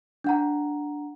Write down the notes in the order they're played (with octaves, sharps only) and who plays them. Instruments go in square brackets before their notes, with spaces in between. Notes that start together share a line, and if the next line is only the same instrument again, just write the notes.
[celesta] D4 F#5 A#5